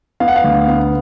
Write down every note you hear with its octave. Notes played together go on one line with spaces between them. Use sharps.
B3 F5
F#5
F5
D2
B3